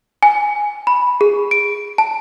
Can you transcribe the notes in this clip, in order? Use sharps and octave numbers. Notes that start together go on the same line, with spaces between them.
G#5
B5
G#4
D7
A5